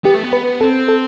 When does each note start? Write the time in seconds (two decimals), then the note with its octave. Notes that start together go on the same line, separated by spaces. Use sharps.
0.05 B3 G4
0.14 A3
0.24 B3
0.33 B4
0.61 C4 A4
0.88 A4